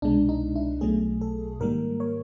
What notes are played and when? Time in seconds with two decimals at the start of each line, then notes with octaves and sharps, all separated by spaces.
0.02 C2 B2 G#3 D4
0.29 D#4
0.56 E4
0.81 B1 B2 F#3 A3 G#4
1.21 A4
1.60 G#2 D#3 G3 A#3 A#4
2.00 C#5